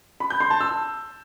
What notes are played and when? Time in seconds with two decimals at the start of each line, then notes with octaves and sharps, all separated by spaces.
0.20 B5
0.30 G6
0.40 C6
0.50 A5
0.61 E6